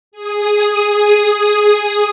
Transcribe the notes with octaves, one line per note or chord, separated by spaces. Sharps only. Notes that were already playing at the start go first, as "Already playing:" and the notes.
G#4 D#6